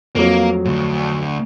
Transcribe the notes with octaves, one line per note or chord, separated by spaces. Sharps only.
F2 F#3 A#3
D2 G#2